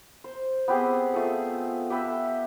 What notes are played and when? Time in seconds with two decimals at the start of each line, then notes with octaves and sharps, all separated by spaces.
0.24 C5
0.68 B3 C4 G4 G#4
1.13 A3 F4 G#4 A4
1.90 G4 A4 B4 E5